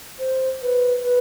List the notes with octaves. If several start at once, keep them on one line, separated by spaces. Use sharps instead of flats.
C5
B4
B4